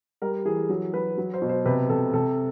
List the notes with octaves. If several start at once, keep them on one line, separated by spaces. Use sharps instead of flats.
G3 A#4
E3 G#4
F#3
F#3 B4
F#3
C5
B2
C5
C3 B4
C3 A4
C3 A4